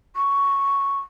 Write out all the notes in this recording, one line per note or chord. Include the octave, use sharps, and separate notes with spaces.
C#6